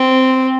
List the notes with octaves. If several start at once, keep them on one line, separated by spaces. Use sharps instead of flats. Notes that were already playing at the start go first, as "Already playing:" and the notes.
Already playing: C4